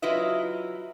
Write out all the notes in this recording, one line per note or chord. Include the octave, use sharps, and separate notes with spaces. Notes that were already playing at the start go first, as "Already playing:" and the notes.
F#3 E4 F4 B4 D#5 E5